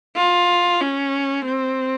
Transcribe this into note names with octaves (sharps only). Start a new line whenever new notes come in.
F4
C#4
C4